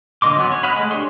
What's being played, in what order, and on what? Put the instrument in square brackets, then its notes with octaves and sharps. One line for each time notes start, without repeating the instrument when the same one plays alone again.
[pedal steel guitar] D3 A#3 D#5 C6 D6
F#3 B3 C#4
C#5
D#5 F5 F#5 B5
G#3 A3
D4 G4 G#4 C#5 C6